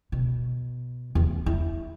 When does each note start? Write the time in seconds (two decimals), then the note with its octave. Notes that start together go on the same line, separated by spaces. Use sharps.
0.12 B2
1.15 E2
1.46 E4